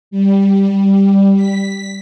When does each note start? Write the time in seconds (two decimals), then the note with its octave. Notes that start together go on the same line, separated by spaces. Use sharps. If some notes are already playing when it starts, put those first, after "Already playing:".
0.11 G3
1.36 B6